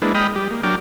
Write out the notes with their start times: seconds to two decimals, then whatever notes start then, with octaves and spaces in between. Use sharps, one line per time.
0.02 G#3 A#3 D4 E4 B4
0.15 G#3 D#5 G5 B5 D#6 F6
0.36 G3 G4
0.51 A#3
0.63 F#3 D4 A#4 G5 D6 F6